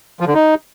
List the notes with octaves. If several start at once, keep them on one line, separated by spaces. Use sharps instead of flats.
F3
D3
D#4